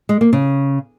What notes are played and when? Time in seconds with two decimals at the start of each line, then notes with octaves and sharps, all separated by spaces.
0.09 G#3
0.21 A#3
0.33 C#3